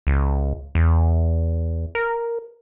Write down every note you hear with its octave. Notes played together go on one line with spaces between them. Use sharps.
C#2
E2
A#4